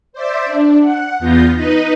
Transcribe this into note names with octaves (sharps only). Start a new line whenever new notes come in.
C5 D5 E5
D4
F#5
E2 B3 F4 G6 A#6
D#4 B4 D#5